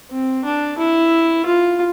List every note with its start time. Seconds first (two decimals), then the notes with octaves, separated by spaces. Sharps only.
0.11 C4
0.45 D4
0.78 E4
1.46 F4